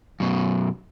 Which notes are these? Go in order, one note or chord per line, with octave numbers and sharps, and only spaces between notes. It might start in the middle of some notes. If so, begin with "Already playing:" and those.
F#2 B2